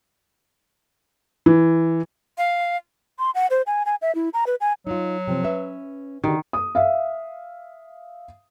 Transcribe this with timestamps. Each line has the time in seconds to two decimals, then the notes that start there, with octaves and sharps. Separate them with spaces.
1.46 E3
2.38 F5
3.19 C6
3.35 F#5
3.50 C5
3.66 G#5
3.86 G#5
4.02 E5
4.15 E4
4.34 A#5
4.47 B4
4.61 G#5
4.87 F#3 D#4 F4
5.27 C3 F3 C4
5.43 C#4 B4 E5
6.24 D3 D#3 F#4 G4
6.53 D#6
6.75 E5 F5